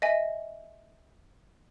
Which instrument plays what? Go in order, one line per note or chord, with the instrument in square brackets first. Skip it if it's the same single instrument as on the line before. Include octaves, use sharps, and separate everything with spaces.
[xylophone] D#5 E5 G#5